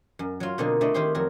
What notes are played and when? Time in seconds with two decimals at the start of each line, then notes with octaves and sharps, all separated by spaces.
0.19 F#2
0.40 F#3 F4
0.58 B2 D3 A#3 C4 D#4
0.81 A3 C4 D4 E4 D#5
0.94 D#3 E4 G4 C5 C6
1.15 F2 F#3 A#4